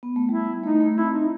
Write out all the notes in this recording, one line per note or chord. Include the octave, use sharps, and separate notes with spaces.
B3
A3
G3 E4
A3 D#4
A3
C4 E4
D#4